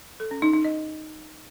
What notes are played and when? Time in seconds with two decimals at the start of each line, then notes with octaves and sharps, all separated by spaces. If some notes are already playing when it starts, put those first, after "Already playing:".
0.20 A4
0.31 C#4
0.42 D#4
0.53 D#4
0.65 D#5